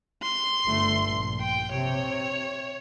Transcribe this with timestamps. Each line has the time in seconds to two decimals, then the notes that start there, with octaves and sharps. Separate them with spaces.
0.23 C6
0.65 G1 A3
1.03 A#1
1.41 G5
1.72 C3 C#5